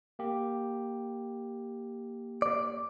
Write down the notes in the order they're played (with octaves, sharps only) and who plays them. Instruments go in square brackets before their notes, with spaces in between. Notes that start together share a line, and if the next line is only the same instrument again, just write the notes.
[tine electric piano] A#3 G4
[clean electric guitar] D5